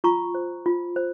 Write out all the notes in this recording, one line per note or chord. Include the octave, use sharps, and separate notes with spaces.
F4 A#5 C#6
C5
F4
C5